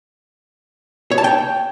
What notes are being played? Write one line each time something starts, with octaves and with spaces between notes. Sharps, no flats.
C#5
A5
G5